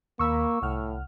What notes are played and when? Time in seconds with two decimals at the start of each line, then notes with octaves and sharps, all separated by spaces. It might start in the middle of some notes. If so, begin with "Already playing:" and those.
0.19 D#2 A#3 A#5 B5 C#6 E6
0.62 C2 A2 F#5 F6